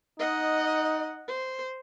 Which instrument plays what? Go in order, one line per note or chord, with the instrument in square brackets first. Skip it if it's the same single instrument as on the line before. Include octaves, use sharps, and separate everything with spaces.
[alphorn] D#4 [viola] D#5 F#5
[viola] C5